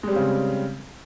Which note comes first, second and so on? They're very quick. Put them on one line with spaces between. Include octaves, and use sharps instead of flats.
G#3 G3 C4 C#3